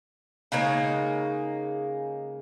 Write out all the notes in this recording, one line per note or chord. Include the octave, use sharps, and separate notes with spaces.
C#3 G#3 A#3 D#4